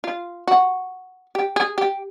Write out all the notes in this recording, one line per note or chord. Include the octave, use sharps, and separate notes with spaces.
F4
F#4
G4
G#4
G4